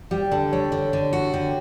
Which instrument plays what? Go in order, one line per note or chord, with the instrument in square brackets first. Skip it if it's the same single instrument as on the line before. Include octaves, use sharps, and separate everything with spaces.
[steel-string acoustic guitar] G3 [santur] G4
[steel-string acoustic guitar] D3 [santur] A4
[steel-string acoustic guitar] G3 [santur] C#5
[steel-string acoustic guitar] D3
D3
F#4
[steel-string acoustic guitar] D3 [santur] G5